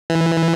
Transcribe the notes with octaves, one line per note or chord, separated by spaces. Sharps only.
E3